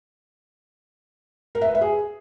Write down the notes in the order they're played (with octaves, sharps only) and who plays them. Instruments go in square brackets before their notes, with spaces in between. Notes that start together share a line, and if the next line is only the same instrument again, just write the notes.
[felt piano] A#4
E5
B4
E5
G#4